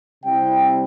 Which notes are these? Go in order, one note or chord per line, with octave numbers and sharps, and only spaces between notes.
C3 G3 C4 E4 G5